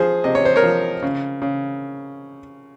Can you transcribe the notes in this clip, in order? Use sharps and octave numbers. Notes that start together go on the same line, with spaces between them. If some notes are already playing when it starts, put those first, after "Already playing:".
Already playing: F3 G#4 C5
C3 D#5
C#5
C5
A#4 C#5
F3
C#3
C#3